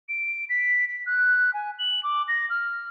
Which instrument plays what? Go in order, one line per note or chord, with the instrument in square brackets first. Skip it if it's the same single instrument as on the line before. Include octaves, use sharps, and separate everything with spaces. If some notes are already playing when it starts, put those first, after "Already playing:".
[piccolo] D7
B6
B6
F#6
G#5
F#7
D6
A#6
F6